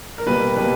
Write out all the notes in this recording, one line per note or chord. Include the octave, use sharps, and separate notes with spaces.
A#4
B2 G3 A#3 B4
B2 G3 A#3 B4